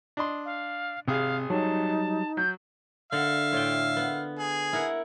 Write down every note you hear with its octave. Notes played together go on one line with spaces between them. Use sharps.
D4 D#5 C6
F5
G#1 C3 G#4 F5
F#3 G3 D#4 A5
F#3 G6
D3 E5 F5
A2 F4 G5
B3
G#4
E4 A#4 F#5